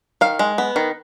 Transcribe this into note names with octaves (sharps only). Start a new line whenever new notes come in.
D#3 F5
G#3
B3
D#3